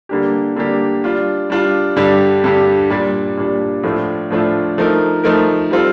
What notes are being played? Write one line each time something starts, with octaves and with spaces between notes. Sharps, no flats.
D3 G3 A#3 D4 G4
D3 G3 A#3 D4 G4
G3 D4 F4
G3 D4 F4
G2 D3 G3 D4 G4
G2 D3 G3 D4 G4
A#2 G3 D4
A#2 G3 D4
A2 F3 A3 D4 F4
A2 F3 A3 D4 F4
F3 A3 D#4 A#4
F3 A3 D#4 A#4
G3 C4 F4 A4